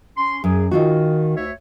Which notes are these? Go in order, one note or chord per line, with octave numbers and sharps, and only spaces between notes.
C#4 C6
F#2 G#4
D#3 D#4 F4 F#4
D2 C#5 E5